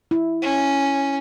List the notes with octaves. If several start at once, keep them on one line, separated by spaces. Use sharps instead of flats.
E4
C#4